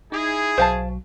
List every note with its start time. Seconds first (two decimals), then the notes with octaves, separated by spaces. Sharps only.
0.12 D#4 E4 G#4
0.58 B1 F#3 C5 F5 A5